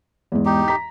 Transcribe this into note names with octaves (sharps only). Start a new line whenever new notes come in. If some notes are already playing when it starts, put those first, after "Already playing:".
E2 G#2
D#4 G4
A#5 B6